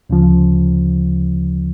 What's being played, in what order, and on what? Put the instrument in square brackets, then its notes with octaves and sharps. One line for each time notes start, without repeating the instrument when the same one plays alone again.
[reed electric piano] D2 C#3 F3